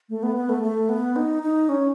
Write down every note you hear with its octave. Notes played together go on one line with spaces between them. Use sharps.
A3
B3
B3
A3
A3
B3
D#4
D#4
C#4